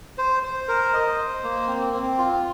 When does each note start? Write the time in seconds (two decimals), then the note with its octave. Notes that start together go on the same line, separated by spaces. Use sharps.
0.18 C5
0.43 C5
0.68 A#4
0.93 D#5
1.18 C5
1.43 A#3
1.68 C4
1.93 C4
2.18 F4